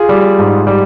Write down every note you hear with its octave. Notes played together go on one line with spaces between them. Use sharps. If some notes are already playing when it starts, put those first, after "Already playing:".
Already playing: F4 G#4
G3
G#2
G3